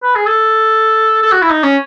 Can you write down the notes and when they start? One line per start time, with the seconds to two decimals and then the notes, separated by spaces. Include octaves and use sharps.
0.03 B4
0.15 G#4
0.26 A4
1.22 A4
1.32 F#4
1.42 E4
1.50 D#4
1.63 C#4